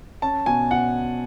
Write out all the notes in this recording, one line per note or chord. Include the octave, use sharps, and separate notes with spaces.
C#4 A5
B2 G#5
B2 F#5